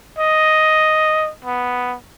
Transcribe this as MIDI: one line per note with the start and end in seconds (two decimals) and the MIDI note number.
0.19 1.31 75
1.45 1.96 59